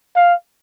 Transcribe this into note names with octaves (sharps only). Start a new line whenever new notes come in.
F5